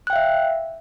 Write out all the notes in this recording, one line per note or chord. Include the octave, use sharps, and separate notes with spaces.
E5 F5 G5 F#6